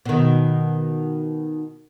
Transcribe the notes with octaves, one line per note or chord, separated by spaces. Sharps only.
B2 D#3